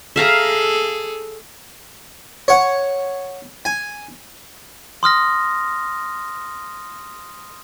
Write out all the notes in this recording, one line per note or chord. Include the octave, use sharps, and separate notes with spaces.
G#4 A4 E5 F5 A#5
C#5 F#5
G#5
C6 D#6 F6 A#6